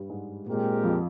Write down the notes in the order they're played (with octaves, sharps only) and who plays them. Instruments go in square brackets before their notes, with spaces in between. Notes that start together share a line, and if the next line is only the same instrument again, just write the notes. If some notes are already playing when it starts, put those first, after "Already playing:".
Already playing: [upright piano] G2 G3
G#2 G#3
[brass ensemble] A#2 G#3 C4 G4 A#4
[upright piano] F2 F3